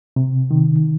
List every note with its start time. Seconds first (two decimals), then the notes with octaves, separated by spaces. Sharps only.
0.16 C3
0.51 D#3